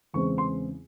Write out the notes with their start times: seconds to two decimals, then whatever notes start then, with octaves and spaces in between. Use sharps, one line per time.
0.14 E2 C#3 E3 G#3 C4 C#6
0.38 C6